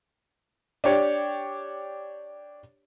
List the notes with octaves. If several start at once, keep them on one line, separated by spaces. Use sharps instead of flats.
D4 G4 C#5 D5